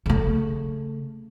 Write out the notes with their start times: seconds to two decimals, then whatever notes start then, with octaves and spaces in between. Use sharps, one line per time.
0.06 C#3 A3